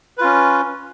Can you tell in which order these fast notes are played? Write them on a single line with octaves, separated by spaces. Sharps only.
B4 F4 C#4